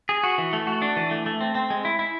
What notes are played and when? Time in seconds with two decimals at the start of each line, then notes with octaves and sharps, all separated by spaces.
0.09 G#4
0.23 F#4
0.38 E3
0.53 A3
0.67 F#4
0.82 D4
0.96 E3
1.11 A3
1.26 A3
1.41 C4
1.55 C4
1.70 G#3
1.85 E4
1.99 E4